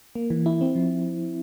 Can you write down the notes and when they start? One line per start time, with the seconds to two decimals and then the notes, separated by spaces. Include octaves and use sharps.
0.15 A#3
0.30 E3
0.46 E4
0.61 C4
0.75 F3